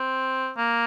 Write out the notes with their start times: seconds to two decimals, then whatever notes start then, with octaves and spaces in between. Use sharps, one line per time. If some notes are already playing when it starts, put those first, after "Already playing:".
Already playing: C4
0.57 A#3